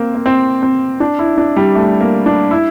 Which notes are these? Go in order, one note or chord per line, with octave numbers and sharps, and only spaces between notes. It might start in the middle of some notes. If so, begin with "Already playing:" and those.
Already playing: A#3 C4
A#3
C4
C4
D4
E4
D4
G3
A3
A#3
D4
E4